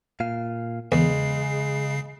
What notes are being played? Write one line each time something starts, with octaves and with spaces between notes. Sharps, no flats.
A#2 F5
E2 C#3 G#3 C7